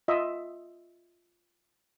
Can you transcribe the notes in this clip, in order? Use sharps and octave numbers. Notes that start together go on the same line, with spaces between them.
F4 D#5 E5